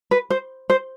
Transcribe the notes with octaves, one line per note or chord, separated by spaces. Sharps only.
B4
C5
C5